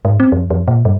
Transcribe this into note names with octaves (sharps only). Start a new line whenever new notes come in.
G#2
C4
F2
F2
A#2
G2